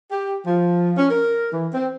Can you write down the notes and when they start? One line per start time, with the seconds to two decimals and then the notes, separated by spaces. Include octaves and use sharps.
0.12 G4
0.46 F3
0.98 C#4
1.10 A#4
1.52 E3
1.74 C4